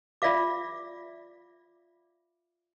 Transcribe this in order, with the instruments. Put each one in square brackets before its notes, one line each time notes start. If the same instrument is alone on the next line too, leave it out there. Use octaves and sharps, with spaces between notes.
[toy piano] F4 D5 E5 F5 D6